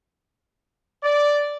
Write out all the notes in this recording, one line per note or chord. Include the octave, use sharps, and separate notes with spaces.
D5